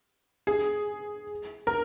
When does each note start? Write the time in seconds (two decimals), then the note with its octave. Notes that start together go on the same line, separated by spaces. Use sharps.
0.47 G#4
1.67 A#4